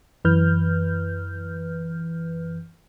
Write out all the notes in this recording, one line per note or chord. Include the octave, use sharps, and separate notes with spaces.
F#2 E3 B4 F6 G6